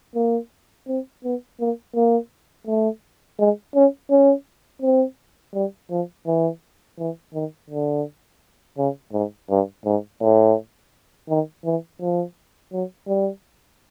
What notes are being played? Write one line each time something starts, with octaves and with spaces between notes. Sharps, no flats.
A#3
C4
B3
A#3
A#3
A3
G#3
C#4
C#4
C4
G3
F3
E3
E3
D#3
D3
C#3
G#2
G2
G#2
A2
D#3
E3
F3
F#3
G3